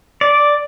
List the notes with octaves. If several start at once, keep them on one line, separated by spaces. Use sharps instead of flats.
D5